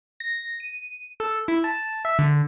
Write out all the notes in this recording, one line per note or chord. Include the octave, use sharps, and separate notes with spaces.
A#6
D#7
A4
E4
A5
E5
D3